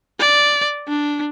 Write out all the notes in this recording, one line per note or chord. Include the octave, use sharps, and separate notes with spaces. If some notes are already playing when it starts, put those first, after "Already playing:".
D5
D4